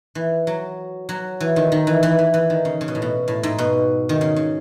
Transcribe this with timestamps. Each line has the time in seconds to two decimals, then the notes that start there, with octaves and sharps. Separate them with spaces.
0.15 E3
0.47 F#3
1.09 F#3
1.41 E3
1.56 D#3
1.72 D#3
1.87 E3
2.03 E3
2.19 E3
2.34 E3
2.50 D#3
2.65 C#3
2.81 C#3
2.88 B2
2.95 A2
3.02 B2
3.28 A2
3.43 G#2
3.58 B2
4.09 D#3
4.21 C#3
4.36 C#3